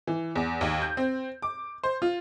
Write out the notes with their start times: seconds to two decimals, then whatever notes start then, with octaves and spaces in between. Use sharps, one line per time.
0.07 E3
0.35 E2
0.61 D#2
0.82 G6
0.97 C4
1.42 D6
1.83 C5
2.02 F4